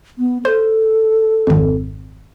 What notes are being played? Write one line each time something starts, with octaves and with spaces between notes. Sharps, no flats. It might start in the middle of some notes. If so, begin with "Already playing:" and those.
B3
A4 C5
G#1 F2